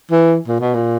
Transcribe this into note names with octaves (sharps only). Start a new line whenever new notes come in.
E3
A#2
B2
A#2